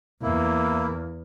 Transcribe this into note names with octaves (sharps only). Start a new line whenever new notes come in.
E2 A#3 E4